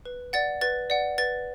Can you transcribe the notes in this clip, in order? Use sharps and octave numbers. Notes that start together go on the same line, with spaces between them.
B4
D5 F#5 A6
B4 A6
D5 F#5
B4 A6